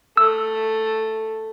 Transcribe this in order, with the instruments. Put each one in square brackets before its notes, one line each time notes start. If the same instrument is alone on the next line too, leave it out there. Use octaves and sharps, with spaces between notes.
[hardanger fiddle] A3 [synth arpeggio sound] E6